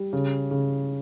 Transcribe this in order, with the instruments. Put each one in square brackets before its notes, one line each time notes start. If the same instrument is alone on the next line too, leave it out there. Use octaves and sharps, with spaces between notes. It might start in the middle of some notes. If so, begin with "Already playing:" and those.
Already playing: [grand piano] G3
C#3
C#3